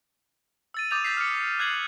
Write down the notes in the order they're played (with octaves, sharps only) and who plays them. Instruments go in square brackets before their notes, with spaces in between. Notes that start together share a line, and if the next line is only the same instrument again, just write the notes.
[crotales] E6 A6 D#7
D6 D#6 G6 A6 D#7 F7
G6 A6 B6 C7
F6 C#7
F#6 G#6 C7 F#7